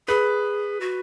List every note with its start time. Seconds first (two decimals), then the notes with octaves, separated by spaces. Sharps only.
0.08 G#4 B4
0.81 F#4